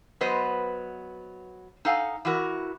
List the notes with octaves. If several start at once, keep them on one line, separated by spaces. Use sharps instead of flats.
F#3 B3 B4 C5 D#5
D#4 A4 F5 F#5 G#5
E3 E4 F#4 A#4